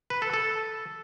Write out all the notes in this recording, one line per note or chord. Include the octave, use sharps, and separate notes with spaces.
B4
A4
A4